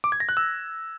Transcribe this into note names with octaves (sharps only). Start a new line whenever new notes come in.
D6
G#6
A#6
F#6
E6